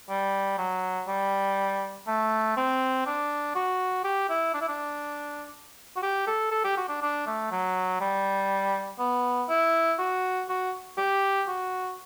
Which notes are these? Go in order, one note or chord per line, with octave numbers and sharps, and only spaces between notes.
G3
F#3
G3
A3
C4
D4
F#4
G4
E4
D4
E4
D4
F#4
G4
A4
A4
G4
F#4
D4
D4
A3
F#3
G3
B3
E4
F#4
F#4
G4
F#4